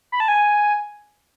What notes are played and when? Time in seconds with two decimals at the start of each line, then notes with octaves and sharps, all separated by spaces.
0.12 B5
0.20 A5
0.28 G#5